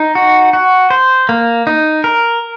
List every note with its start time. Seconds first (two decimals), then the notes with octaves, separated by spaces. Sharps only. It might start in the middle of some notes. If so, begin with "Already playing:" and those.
Already playing: D#4
0.15 F#4
0.53 F#4
0.90 C5
1.29 A#3
1.67 D#4
2.04 A#4